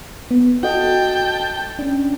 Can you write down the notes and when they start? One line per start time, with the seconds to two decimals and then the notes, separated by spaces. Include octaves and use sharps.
0.31 B3
0.63 F#4 A4 D#5 G5 A5
1.79 C#4 D4